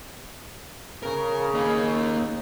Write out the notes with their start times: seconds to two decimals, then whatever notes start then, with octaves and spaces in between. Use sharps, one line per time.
1.03 C#3 A#4
1.54 A#3 D#4